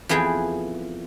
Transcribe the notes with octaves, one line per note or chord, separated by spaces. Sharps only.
F2 E3 B3 G#4 G5